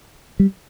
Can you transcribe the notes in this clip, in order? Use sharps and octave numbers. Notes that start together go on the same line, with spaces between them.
G3